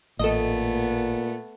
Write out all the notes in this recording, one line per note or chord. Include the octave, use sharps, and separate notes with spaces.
A1 A#2 A3 B3 A4 D#5